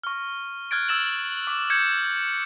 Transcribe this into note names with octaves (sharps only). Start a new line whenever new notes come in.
C#6 F6
F6 F#6 G#6 A6 D7
E6 A6 E7 F#7
D6
G6 G#6 C#7 E7